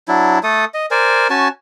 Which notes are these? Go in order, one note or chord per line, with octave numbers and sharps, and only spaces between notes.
F#3 D4 E4
A3 A4 D#6
D#5
A#4 C5 D5 G#5
C#4 F#4 G#5 A5